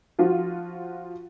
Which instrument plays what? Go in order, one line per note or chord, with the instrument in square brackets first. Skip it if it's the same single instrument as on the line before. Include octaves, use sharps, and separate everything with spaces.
[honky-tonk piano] F3 F4 F#4